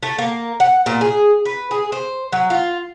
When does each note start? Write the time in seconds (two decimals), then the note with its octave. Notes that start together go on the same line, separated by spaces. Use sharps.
0.03 A3
0.18 A#3
0.60 F#5
0.86 A#2
1.01 G#4
1.45 B4
1.71 G#4
1.92 C5
2.32 F#3
2.50 F4